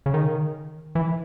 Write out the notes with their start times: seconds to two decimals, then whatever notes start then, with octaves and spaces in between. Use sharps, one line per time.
0.06 C#3
0.14 D#3
0.95 E3